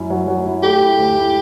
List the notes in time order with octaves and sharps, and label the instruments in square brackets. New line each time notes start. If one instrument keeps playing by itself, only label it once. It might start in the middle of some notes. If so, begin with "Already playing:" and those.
Already playing: [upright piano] F#2 E4
F#3
F#3
E4
[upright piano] A3 [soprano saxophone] G4
[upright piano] E4
D2
E4